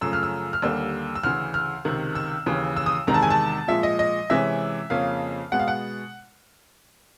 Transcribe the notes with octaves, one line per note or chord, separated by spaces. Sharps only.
F#2 C#3 F3 A3 E6
F6
E6
F6
D#2 D3 G3 A#3 E6
E6
D2 C#3 E3 F6
F6
C#2 C3 D#3
E6
D#2 C#3 E3
E6
D#6
E2 C3 D#3 G#3 A#5
A5
G#5
A5
A#2 F3 G#3 E5
D#5
D#5
C3 E3 G#3 C#4 E5
F2 C#3 F3 A#3 C#4 F5
B2 G#3 B3 F#5
F5
F#5